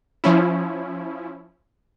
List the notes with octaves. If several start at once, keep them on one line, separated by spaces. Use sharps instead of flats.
F3 C#4 E4